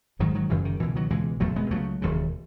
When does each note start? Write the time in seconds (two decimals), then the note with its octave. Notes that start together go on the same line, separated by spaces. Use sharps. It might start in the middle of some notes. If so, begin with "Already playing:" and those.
0.19 G#1 G#2 D#3 F#3
0.35 D#3 F#3
0.50 F#1 F#2 C#3 E3
0.65 D#3
0.80 C#2 B2 E3
0.95 D#3 F#3
1.10 C#2 B2 E3 G#3
1.40 F#1 E2 B2 F#3 A3
1.56 G#3 B3
1.71 C#2 C#3 F#3 A3
2.02 E1 D#2 C#3